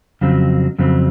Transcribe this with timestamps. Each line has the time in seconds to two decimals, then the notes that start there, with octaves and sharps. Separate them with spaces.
0.21 F2 C#3 F#3 C4
0.79 F2 C#3 F#3 C4